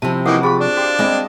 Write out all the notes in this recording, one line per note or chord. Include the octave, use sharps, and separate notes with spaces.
C3 F3 C4 E4 A5
E3 A#3 D#4 F#4 F#5 D6 D#6
F4 G#4 G5 B5 C#6
D4
F#4 G4 C5 F5
G#3 C4 G#4 D#5 G5 B5